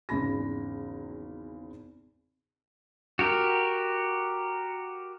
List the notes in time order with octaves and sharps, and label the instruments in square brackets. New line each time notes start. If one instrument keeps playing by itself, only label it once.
[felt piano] G#1 E2 C#3 B5 A#6
[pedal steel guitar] F#4 G4 A#4